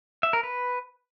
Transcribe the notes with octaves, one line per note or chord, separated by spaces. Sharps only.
E5
A#4
B4